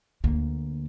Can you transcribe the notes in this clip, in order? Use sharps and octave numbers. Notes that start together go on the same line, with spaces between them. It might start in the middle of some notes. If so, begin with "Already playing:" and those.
D2 A#3